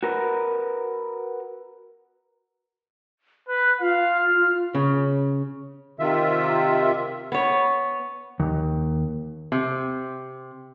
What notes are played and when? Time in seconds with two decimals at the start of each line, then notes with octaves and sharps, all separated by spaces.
0.03 F#4 A#4 B4
3.48 B4 F#6
3.80 F4 F5
4.19 F6
4.75 C#3
5.99 C3 D#3 F4 E5
7.32 B3 C#5
8.40 D#2
9.52 C3